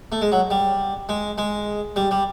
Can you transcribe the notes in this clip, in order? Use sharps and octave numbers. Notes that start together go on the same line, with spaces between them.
A3
G#3
F#3
G3
G#3
G#3
G3
G3